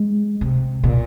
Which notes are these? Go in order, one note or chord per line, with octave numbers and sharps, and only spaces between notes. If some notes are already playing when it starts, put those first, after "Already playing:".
Already playing: G#3
C3
A#2